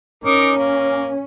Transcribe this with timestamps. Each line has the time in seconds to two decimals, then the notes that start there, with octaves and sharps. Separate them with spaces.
0.24 C#4 D#4 A#4 D6
0.57 A#3